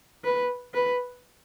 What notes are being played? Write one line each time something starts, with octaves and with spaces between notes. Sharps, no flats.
B4
B4